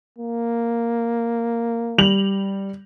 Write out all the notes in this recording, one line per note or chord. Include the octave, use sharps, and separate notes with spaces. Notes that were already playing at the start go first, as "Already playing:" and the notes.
A#3
G3 F7 F#7